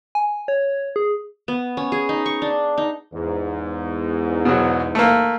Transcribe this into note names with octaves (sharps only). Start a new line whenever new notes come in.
G#5
C#5
G#4
B3
C#4
G#4
D#4
C#6
D4
D#4
E2 G#2
B2 F#3
A3 A#3